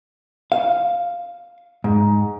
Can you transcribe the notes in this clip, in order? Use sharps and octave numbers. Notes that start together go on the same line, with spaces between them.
F5
G#2